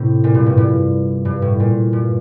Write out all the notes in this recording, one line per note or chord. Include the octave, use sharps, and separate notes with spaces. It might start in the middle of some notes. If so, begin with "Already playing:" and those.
Already playing: A2 C3
A#2
G2
A2
G2
G2
A2
A#2
G2